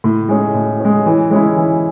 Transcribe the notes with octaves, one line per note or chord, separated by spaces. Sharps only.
A2
G#3 C#4
A2
G#3 C#4
E3
G#3 C#4 E4
E3